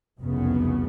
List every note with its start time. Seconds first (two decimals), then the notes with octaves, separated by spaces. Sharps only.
0.20 F1 C2 F#2 C#3 B3